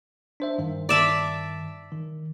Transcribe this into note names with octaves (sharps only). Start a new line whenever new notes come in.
D4 C5 E5
G2 D#3
D5 E5 A5
D#3